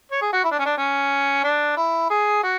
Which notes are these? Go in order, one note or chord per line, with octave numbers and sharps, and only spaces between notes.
C#5
G#4
F#4
E4
D4
C#4
D4
C#4
D4
E4
G#4
F#4